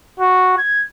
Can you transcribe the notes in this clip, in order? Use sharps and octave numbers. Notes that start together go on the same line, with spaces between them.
F#4
G#6